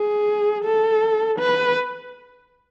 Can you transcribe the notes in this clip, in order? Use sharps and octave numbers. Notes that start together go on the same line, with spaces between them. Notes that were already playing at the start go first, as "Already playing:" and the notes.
Already playing: G#4
A4
B4